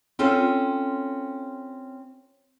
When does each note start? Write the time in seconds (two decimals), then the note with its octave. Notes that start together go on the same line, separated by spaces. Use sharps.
0.19 C4 C#4 F4 A4